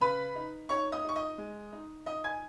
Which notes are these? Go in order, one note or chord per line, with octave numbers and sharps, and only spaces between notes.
C#3 B4 B5
D#4
D#4 C#5 C#6
D#5 D#6
D#4 C#6
D#5 D#6
G#3
D#4
D#4 D#5 D#6
G#5 G#6